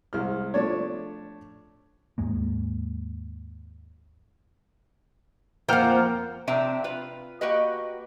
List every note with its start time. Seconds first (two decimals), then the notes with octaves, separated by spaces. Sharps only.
0.13 C2 G#3 F6
0.54 F3 A3 D4 C#5
2.18 D#2 G#2 G#3 A#3
5.69 F2 F3 A#3 F#5 G5 F6
6.47 C3 F3 C4 D4 E5 A#5
6.84 F4 B4
7.41 A#3 F#4 G4 B4 D#5